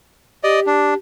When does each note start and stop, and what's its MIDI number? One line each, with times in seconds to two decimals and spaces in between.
0.44 0.97 67
0.44 0.60 74
0.44 0.60 75
0.67 0.94 62